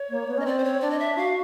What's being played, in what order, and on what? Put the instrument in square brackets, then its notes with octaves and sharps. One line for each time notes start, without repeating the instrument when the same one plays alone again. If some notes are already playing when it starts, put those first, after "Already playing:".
Already playing: [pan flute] C#5
[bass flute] A#3
B3
[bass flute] C#4 [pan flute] D#5
[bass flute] C4 [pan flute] D5
[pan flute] C5
C#5
[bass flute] D4 [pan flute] D5
[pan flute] D#5
E5
[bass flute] F#4 [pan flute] F5